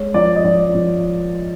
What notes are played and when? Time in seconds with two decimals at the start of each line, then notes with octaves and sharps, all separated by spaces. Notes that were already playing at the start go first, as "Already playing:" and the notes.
Already playing: G#3 C#5
0.14 F3 D5
0.36 D#5
0.44 F3 D5
0.75 F3